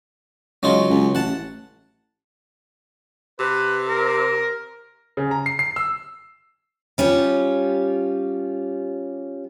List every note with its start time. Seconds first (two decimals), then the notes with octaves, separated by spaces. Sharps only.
0.63 C#2 F#3 D#4 F4
0.90 C#2
1.15 A1 F#5 A5
3.40 C3 B4
3.88 A#4
5.17 C#3
5.31 A#5
5.46 C7
5.59 C7
5.76 E6
6.98 G3 C#4 F4 G4